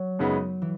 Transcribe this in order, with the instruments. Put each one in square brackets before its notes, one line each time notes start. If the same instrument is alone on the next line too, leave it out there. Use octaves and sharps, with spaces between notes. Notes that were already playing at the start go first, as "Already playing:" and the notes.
Already playing: [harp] F#3
[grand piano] F#2 C#3 G#3 B3 D#4
[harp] E3